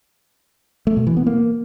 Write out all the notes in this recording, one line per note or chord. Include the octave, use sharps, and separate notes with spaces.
A3
B2
E3
B3
A#3